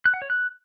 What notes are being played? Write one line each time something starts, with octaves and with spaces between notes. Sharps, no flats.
F#6
F#5
C#5
F#6